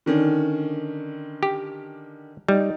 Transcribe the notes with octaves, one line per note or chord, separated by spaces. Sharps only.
D3 D#3 C#4
G4
G3 D#4